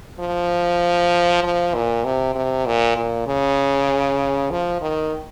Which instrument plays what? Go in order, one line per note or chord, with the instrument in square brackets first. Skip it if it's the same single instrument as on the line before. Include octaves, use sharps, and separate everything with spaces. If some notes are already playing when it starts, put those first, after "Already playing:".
[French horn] F3
F3
A#2
C3
C3
A#2
A#2
C#3
F3
D#3